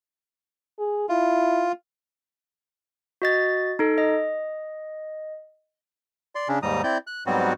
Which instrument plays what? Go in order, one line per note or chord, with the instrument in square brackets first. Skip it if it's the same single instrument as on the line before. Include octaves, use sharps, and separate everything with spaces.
[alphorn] G#4
[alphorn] E4 [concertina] F4
[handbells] F#4 D#5 A6
D#4 A4
D#5
[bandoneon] D5 C6
C#3 C#4 D4
D#2 G#2 G3 A#5 D#6
C4 E4 D5 G6
F#6
G#2 F#3 G3 B3 C4 F#4